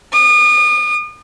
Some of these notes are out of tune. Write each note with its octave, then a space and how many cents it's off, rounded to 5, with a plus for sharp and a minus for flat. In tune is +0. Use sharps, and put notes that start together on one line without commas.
D#6 -40